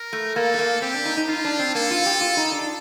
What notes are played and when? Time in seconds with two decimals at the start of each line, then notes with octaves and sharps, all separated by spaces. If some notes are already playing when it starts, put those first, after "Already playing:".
Already playing: A#4
0.13 A3
0.35 A#3 A4
0.54 A3
0.59 A#3
0.82 C4 G4
0.94 D4
1.06 D#4
1.17 D#4
1.28 D#4 F4
1.45 D4
1.59 C4
1.75 A#3 A4
1.90 F4
2.06 G4
2.21 F4
2.37 D#4
2.52 D4